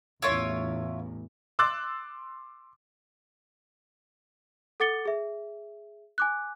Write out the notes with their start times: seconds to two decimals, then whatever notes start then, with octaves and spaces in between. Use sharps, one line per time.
0.22 A1 E2 E4 F4 C#5
1.59 C6 D6 E6 F#6 A6
4.80 A4 F#5 D6 A6 C#7 G7
5.05 G#4 E5
6.18 G#5 D6 F#6